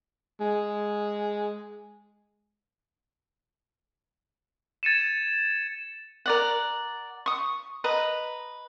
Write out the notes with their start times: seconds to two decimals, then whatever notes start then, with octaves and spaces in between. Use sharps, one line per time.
0.40 G#3
4.83 G#6 A6 C#7 D#7 E7
6.26 A#4 D5 F#5
7.26 C#6 D#6
7.84 B4 D#5 A#5